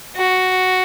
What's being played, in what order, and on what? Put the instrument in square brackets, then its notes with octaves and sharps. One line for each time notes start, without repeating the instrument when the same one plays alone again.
[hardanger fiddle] F#4